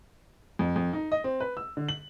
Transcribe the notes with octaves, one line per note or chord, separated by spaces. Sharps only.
F2
F2
D#4
D#5
C4
B4
E6
D3
F#7